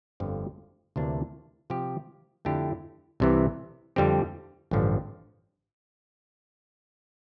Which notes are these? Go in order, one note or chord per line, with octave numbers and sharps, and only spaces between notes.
G1 F2 D3 F3
D2 C3 E3 A#3 D4
C3 F3 C4 G4
F2 D3 A3 E4 G4
C2 C3 E3
F2 D3 G3 C4 G4
A1 G2 D3 F3